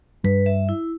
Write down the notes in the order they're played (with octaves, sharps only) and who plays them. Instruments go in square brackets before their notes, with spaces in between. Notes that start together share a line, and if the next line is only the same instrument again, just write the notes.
[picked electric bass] G2 G3 [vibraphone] B4
[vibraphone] E5
E4